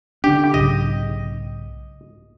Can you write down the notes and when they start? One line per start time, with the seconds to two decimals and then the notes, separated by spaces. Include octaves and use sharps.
0.24 D3 D4 G4
0.54 B1 G#2 C#3 D#5